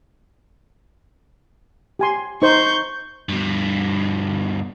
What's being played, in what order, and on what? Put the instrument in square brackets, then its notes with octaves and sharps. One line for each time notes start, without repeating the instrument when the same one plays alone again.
[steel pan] G4 G#5 C6
[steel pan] D#4 C5 [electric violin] C#6 G6
[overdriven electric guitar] G2 B2